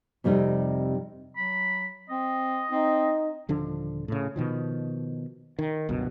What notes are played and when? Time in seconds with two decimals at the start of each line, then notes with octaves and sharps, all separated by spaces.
0.24 F2 C3 G3 D#4
1.37 F#3 B5
2.09 C4 D#5
2.71 C4 D#4
3.49 D#1 D3 F3 D4
4.08 A2 C#3
4.36 B2 D#3 F3
5.59 D#3
5.89 G1 C#2 B2 F#3